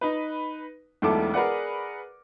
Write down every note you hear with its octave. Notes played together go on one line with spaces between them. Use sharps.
D#4 B4
E1 B1 A3 E4 A4 D6
G#4 A#4 B4 D5 F#5